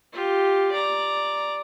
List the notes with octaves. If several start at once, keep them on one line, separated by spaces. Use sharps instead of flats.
F4 G4
D5 A#5